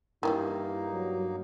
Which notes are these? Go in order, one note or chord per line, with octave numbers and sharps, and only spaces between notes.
G2 D#3 E3 G3 A#3 D#4 E4
F#3